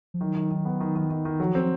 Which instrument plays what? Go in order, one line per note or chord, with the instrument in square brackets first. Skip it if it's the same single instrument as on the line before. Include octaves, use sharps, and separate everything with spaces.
[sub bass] F3
[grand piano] D#3 [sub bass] F#3
[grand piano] D#3
D#3
B3
D#3
D#3
D#3
D#3
[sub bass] F3 [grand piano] F#3
[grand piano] C4